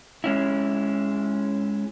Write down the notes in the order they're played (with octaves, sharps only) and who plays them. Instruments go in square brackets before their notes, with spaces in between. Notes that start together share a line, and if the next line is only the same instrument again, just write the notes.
[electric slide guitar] G#3 C#4 E4